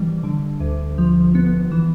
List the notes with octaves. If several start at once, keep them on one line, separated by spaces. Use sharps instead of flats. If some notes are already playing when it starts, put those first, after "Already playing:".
Already playing: F2 C3 E3 G3
D3
D2
F3
B3
E3